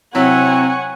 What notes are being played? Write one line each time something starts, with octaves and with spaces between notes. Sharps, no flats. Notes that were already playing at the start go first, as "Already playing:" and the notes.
C3 F#3 C4 E4 C#5 F#5 G#5